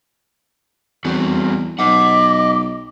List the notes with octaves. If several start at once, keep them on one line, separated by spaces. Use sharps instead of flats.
E2 G3 C4 F#4
B1 D#5 F#5 D6